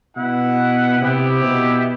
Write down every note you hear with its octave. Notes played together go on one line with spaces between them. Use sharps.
B2 E4 B4 F#5
C3 B3 E4 G4
B2